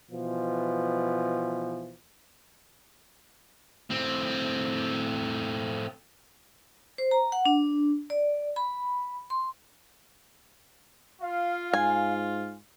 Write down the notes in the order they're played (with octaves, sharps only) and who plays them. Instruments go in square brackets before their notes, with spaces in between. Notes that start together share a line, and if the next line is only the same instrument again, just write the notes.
[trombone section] B2 E3 F3
[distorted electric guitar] A2 C4
[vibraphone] C5
A#5
F#5
D4
D5
B5
C6
[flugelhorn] F4 [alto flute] F5
[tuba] G#2 [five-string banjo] G#5